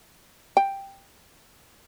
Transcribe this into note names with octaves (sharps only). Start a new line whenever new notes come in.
G5